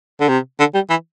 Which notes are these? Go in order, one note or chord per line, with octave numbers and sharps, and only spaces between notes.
D3
C3
D3
G3
E3